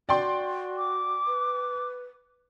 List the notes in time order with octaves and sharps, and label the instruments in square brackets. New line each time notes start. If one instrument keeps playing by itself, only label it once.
[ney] F#4 [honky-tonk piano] D5 G5 C6
[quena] D6
[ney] B4